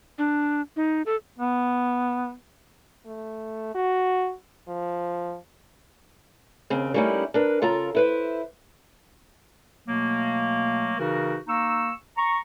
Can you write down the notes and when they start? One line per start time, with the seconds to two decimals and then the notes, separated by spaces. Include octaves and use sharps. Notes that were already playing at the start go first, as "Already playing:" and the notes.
0.18 D4
0.76 D#4
1.06 A4
1.38 B3
3.06 A3
3.75 F#4
4.68 F3
6.70 D#2 C#3 C4
6.94 G3 A3 A#3 C#4 D#4 E4
7.34 D4 A#4 B4
7.62 C#3 F4 A4 A#4 A#5
7.95 E4 B4 C5
9.86 B2 F#3 A3 A#3
10.99 C#3 E3 D#4 F#4 A#4
11.48 A#3 D#4 C#6 E6
12.17 A#5 C#6